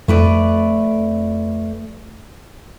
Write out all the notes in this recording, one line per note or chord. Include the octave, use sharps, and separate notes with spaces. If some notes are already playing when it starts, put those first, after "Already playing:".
F2 A3 B4 D5